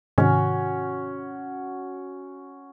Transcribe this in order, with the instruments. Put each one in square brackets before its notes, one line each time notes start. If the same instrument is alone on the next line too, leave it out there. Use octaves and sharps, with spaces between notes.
[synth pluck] G#2 C3 D#3 [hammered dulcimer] C#4 F#4